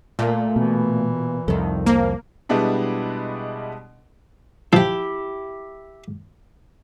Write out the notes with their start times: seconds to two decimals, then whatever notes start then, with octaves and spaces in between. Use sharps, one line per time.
0.19 A#2 A3 A#3
0.56 B2 E3
1.48 C2 F2 D#3 A4
1.86 F3 A#3
2.49 B2 G3 G#3 B3 D4 E4
4.73 F3 E4 G4